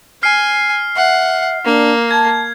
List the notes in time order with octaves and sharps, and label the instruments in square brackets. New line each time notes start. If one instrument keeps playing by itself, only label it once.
[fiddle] G#5 [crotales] F6 C7
[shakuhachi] E5 [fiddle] F#5
[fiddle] A#3 [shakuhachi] D4
[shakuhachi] A5 [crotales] G#6